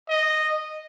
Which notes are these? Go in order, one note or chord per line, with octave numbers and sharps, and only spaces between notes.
D#5